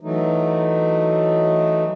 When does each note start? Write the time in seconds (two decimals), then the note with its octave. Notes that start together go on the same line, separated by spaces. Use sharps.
0.01 E3 F#3 A3 D#4